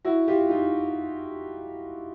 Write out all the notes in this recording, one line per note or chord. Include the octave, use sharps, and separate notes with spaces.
E4 F#4
F4 G4
D#4 F4